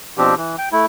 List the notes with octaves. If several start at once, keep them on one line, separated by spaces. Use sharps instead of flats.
B2 F3 C4 D4 G4
E3
G5
A3 E4